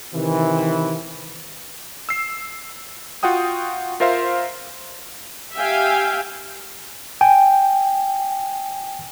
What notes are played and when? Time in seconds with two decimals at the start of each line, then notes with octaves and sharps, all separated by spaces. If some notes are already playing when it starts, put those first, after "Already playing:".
0.14 C3 D#3 E3
2.09 E6 C7
3.23 F4 F#4 F#5 G5 D#6
4.00 F4 A#4 C5 E5 F5 C6
5.55 G4 E5 F5 G5 G#5
7.21 G5 G#5